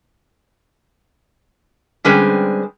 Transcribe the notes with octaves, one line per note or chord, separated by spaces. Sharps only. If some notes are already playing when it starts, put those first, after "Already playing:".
D3 G3 G#3 C4 C#4 B4